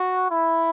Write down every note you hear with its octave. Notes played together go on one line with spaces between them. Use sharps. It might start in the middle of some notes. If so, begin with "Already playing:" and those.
Already playing: F#4
E4